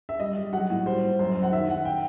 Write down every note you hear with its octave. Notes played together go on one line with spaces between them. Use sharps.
E5
G3 D#5
G3
F#3 F#5
A2
G3 C5
A2
F#2 C5
F#2
F#5
D#3 E5
D#3 F#5
G5